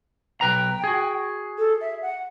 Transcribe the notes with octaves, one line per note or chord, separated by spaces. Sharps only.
B1 B4 G5 A#5
F#4 G#4
A4
E5
F#5